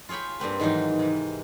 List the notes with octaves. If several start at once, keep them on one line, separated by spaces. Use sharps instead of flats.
F4 G#4 C#5 G5 B5
G2 A#3 C4 B4
G#2 D#3 E3 F#3 D#4
C3 E3